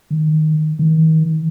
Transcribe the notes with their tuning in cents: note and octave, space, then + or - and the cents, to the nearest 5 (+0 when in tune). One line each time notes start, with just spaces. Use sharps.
D#3 +0
D#3 +35